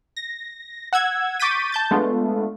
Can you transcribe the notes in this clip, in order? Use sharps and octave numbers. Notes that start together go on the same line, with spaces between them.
A#6
F#5 E6 G#6
C#6 D6 G6 A6 B6 D#7
A5 G6 A6
G#3 A3 B3 D4 F4